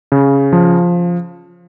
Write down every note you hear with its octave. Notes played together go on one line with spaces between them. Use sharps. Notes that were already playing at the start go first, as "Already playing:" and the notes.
C#3
F3